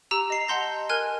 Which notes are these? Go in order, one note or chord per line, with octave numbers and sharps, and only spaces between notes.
G4 A#5 E6
D#5 C7 F7
D#5 F#5 A5 C6 G6 A#6
A#4 G#5 F6 F#6 G#6 D#7